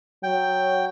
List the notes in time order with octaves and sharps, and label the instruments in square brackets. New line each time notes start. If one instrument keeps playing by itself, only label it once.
[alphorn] F#3 [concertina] G5